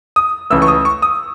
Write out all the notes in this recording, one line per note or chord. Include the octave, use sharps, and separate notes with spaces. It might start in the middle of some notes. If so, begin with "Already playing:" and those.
D#6
C#2 C#3 E3 A3 E6
C#6
D#6
C#6
D#6